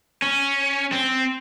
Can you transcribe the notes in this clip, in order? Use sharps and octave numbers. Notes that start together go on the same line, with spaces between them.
C#4
C4